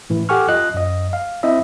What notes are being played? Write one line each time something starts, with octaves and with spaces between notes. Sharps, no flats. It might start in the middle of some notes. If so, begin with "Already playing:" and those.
A2 E3
G4 A4 F#5 G#5 C#6 F6
F4 D#5 F#6
F#2 D#5
F5
C4 E4 D#5 E5